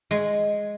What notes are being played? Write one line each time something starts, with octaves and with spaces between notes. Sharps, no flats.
G#3